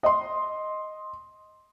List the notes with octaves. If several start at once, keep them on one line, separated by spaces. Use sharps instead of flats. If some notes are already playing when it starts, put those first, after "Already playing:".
D#5 C6